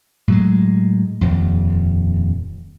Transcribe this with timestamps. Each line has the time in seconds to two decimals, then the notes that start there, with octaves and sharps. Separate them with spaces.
0.28 A2 F#3 G#3
1.21 D#1 F2